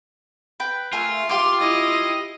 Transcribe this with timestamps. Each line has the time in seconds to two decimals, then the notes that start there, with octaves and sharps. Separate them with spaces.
0.60 B4 G5
0.93 A3 F4 G#4 A#4
1.29 G4 F5 C6 D6
1.60 E4 D#5